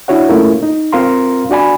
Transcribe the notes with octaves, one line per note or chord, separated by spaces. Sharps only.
D4 E4 F#4 C#5 F#5
A3 A#3 C#4 E4 F4 A#4
D#4
C4 F4 A#4 F5 A#5 C6
D4 F#4 D5 G#5 B5